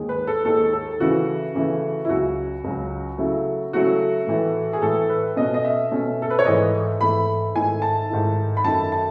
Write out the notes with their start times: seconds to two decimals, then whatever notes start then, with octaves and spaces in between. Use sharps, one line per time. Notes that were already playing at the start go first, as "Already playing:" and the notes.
Already playing: D#2 D#3 G#3
0.09 B4
0.27 A4
0.45 D#2 D#3 G#3 A4
0.73 A4
1.00 C#3 E3 A3 E4 F#4
1.55 C#3 E3 A3 E4
2.05 E4
2.09 C#2 C#3 F#3 F#4
2.64 C#2 C#3 F#3
3.18 C#3 F#3 A3 E4
3.73 C#3 F#3 A3 E4 F#4
4.27 A2 E3 A3
4.73 G#4
4.82 A2 E3 A3 A4
5.10 B4
5.36 B2 A3 C#4 D#5
5.54 D#5
5.64 E5
5.91 B2 A3 C#4
6.22 A4
6.30 B4
6.39 C#5
6.45 G#2 E3 A3 D#5
7.00 G#2 E3 A3 B5
7.55 G#2 D#3 A3 E4 G#5
7.82 A5
8.09 G#2 D#3 A3 E4
8.57 B5
8.64 F#2 D#3 A3 A5
8.92 A5